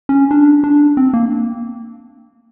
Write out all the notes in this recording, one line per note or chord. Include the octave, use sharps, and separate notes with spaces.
C#4
D4
D4
C4
A#3